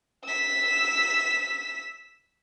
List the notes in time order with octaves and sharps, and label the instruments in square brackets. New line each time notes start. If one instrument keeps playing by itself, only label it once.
[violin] E6 B6